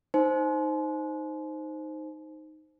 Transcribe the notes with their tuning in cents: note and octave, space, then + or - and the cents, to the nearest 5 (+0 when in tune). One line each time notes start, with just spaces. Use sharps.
D#4 +0 C5 +0 G#5 +45